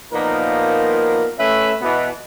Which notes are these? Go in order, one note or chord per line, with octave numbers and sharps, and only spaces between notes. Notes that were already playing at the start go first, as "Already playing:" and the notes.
A#2 F3 A#3 B3 D#4 A#4
A3 C#4 B4 E5
B2 E3 B3